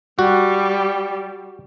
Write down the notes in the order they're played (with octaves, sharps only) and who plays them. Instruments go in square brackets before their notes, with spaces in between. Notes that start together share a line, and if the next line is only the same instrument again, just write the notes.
[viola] G3 [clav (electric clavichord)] F#4